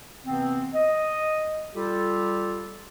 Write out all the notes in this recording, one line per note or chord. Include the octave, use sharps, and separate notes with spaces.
C3 E3 B3 C4
D#5
G3 F4 G4 A4